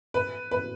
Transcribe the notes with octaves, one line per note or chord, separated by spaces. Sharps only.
B4
B4